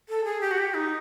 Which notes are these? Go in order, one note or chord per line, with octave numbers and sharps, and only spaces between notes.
A4
G#4
G4
F#4
G4
D#4